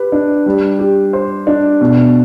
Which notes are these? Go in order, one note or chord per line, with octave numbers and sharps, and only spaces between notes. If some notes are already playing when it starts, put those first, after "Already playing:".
Already playing: G4 B4
D4
G3
G4
C5
D4
B2